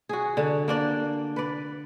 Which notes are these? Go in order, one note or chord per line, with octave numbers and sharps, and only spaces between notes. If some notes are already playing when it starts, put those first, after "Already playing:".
F#4 G#4
D3
A#3 D4 D5
B4 D5